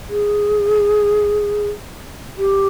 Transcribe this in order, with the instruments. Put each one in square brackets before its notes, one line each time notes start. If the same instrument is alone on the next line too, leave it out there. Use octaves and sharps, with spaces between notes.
[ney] G#4
G4